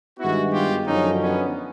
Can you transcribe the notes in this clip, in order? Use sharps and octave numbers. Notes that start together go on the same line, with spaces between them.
G2 D#3 G#3 B3 E4 F#4
F4 G4
F#2 D3 F3 C#4 D#4
B3 C#4